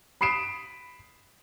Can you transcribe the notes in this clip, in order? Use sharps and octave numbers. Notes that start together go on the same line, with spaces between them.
B5 D#6 C7 D7 E7